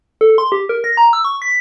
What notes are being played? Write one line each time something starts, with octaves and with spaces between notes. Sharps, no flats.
A4
C6
G4
A#4
A#6
A#5
E6
C#6
B6